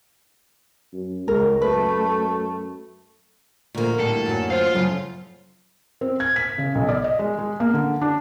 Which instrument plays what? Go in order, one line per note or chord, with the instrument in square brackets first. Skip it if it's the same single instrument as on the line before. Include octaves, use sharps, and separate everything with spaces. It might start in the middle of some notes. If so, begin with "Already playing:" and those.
[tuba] F#2
[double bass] C#2 [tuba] G#3 [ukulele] A#4
[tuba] F#2 [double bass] A3 [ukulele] B4
[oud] D2 A#3 [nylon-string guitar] A#2 F3
[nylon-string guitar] A2 G3 [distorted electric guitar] A4
[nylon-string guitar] F#2 F#3
[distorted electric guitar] F4 F5 [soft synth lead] C5
[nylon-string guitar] F#2 C#3 A4 [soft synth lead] F#3
[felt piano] C4
G#6
B6
C#3
B1
D5
D#5
G#3
G#3
A#3
D3
D4